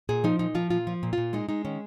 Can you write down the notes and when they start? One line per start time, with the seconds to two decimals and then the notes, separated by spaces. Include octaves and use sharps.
0.09 A#2 G#4
0.24 F3 D#4
0.39 A#2 D#4
0.55 F3 F4
0.70 A#2 F4
0.87 F3
1.03 A#2
1.13 A#2 F4
1.33 G#3 D#4
1.49 G#3 D#4
1.65 D#3 C#4